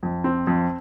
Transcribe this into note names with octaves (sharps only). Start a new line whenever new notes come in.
F2
C4
F2